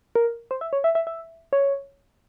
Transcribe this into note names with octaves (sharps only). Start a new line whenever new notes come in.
A#4
C5
E5
C#5
E5
E5
E5
C#5